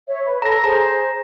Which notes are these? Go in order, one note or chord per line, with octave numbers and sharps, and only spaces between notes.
C#5 E5
B4
A4 C#5 A#5 A#6
G#4 C5 A#5